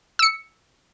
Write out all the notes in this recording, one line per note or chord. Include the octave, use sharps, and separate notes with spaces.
E6 C#7